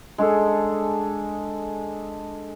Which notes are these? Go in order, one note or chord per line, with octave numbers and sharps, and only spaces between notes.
G#3 D4 G#4 A4